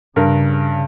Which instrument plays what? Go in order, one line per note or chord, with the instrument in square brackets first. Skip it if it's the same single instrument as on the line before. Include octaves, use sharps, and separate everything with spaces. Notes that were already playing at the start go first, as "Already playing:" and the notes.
[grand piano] G2 A#4 [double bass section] C#3